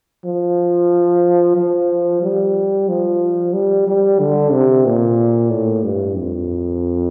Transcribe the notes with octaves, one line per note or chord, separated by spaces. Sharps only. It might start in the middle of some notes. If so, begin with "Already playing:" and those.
F3
F3
G3
F3
G3
G3
D3
C3
A#2
A2
G2
F2